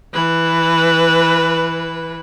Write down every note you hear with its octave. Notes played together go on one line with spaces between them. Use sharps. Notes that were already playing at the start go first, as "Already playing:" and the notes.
E3 B4